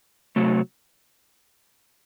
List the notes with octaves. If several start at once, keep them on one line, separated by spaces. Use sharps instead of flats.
C3 F#3 A3